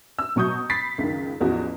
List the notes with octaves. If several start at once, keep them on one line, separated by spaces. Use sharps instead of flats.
E6
B2 F#3 C#6 D#6 G6
B5 A6 B6 C7
C#2 F#2 D#3
A1 E2 F3 F#4